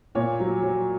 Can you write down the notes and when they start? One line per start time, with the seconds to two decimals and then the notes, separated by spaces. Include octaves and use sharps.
0.15 A#2 C#5
0.39 F#3
0.62 F#3